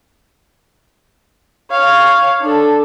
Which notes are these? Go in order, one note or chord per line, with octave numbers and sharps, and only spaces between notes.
C#5 F5
D4 A4